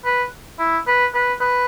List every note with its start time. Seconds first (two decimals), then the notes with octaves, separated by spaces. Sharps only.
0.05 B4
0.59 E4
0.87 B4
1.14 B4
1.41 B4